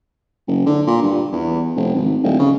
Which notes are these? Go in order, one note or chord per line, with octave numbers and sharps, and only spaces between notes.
F#1
D3
A#2
G2
E2
F1
G#1
D1
C#3